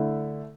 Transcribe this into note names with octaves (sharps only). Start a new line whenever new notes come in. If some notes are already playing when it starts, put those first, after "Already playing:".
Already playing: D3 A3 E4